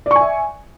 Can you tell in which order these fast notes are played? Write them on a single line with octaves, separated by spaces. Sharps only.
D5 C#6 G#5 E5